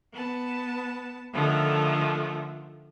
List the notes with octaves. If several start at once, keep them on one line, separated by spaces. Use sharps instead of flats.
B3 A5
D3 D#3 F3 A3